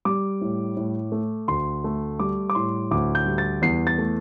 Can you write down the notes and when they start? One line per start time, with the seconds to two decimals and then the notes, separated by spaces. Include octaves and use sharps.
0.05 G3 D6
0.41 A2
0.77 A2
1.12 A3
1.48 D2 C6
1.84 A3
2.20 G3 D6
2.50 D6
2.55 A2 C6
2.91 D2 D6
3.15 G6
3.26 G3
3.38 A6
3.62 E2 C7
3.87 A6
3.98 A3